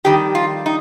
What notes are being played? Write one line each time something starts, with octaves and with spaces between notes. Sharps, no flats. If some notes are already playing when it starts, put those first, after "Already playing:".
F2 D#3 G3 G4
F4
D#4